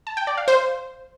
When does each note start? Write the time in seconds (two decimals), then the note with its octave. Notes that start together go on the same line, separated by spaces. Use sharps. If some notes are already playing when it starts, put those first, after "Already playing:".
0.07 A5
0.17 G5
0.27 D5
0.37 F5
0.48 C5